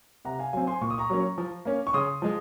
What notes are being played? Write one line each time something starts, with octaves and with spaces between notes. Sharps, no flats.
C3 F#5 A#5
F5 G#5
F#3 C4 F5 G#5
G#5 C6
A#2 C#6
D#6
A#5 C#6
F#3 A#3 C#4
F3
A#3 C#4
C#6
C#3 C6 D#6
F3 G#3